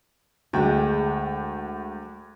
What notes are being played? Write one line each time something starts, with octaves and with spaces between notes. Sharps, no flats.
D2 G#3 F#4 G5